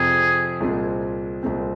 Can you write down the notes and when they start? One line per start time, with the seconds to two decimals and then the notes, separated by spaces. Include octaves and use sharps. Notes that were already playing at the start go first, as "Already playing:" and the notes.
Already playing: F2 C3 F3 G#4
0.61 C2 A#2 G#3 C4
1.43 C2 A#2 G#3 C4